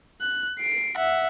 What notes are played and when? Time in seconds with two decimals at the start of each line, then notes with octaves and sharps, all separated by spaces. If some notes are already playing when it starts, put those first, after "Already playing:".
0.21 F#6
0.59 C7 D7
0.97 E5 F#5